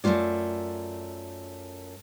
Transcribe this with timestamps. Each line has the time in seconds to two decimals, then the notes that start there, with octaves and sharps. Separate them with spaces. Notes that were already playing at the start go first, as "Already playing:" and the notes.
0.04 F#2 C3 A3 F4 D5